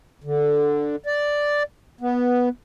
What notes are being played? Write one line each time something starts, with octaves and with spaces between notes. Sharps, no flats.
D3
D5
B3